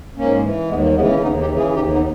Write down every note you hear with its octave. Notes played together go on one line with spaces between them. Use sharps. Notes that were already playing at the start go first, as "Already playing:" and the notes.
G#2 A#3 C#4
E3
D#2 G#3 B3
G3 A#3
C#3 E3 G#3 B3
A#3 C#4
D#2 B3 D#4
D#4 G4
C#3 E3
E4 G#4
D#2 D#4 G4
B3 D#4